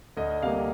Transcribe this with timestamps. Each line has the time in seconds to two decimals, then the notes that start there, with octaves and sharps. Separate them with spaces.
0.17 D2 D#5
0.42 C3 G3 A#3 F5